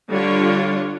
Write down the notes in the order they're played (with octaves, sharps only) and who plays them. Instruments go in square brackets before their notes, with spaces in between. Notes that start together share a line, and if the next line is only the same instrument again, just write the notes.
[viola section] D3 G3 D4 F4 C#5